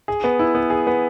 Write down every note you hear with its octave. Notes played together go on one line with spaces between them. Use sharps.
G#4
B3
E4
B3
G#4
B3